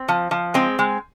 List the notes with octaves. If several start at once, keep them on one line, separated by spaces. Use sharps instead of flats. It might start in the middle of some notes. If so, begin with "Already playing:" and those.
Already playing: C4
F3
F3
G#3 C4
G#3